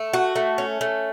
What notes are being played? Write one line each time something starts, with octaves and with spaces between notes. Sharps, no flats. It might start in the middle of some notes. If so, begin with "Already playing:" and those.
Already playing: A3
F#4
A3
C#4
A3